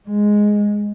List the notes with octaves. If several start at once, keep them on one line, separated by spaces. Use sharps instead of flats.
G#3